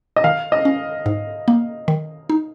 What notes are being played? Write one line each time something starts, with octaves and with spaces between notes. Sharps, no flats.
D#5
D#3 F5
D#5
C#4
G#2
A#3
D#3
D#4